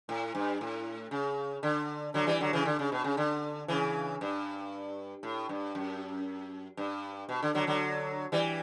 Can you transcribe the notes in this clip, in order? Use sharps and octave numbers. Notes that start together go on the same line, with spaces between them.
A2
G2
A2
C#3
D3
D3 F#3
E3 G3
D3 F#3
C#3 E3
D3
C#3
B2
C#3
D3
C#3 E3
G2
A2
G2
F#2
G2
B2
D3
D3 F#3
D3 F#3
E3 G3